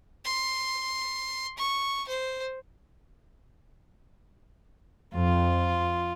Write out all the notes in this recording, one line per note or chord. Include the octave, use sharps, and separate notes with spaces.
C6
C#6
C5
F2 F4